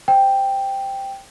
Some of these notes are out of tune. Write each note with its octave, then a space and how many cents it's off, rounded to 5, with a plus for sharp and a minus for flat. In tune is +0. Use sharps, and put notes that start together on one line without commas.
C5 +0 G5 +0